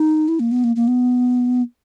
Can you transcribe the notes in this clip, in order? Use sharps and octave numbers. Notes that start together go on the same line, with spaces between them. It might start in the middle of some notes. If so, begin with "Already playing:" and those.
Already playing: D#4
E4
A#3
B3
A#3
A#3
B3